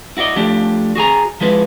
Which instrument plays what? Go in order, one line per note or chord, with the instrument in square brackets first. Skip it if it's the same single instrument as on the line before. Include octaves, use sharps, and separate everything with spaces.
[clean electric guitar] E4 F#4 B4 D5 D#5
F3 A3 D4 G4
F#4 G#4 G#5 A#5
F3 G#3 E4 B4